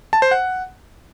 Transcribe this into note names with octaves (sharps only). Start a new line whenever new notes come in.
A5
C5
F#5